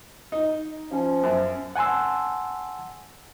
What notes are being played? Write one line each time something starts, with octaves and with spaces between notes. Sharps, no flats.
D#4
F3 C#4
F#2
F#5 G#5 A5 C6 E6